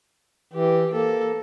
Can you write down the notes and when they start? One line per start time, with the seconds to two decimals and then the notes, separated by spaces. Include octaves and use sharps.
0.53 E3 G4
0.93 A#3 A4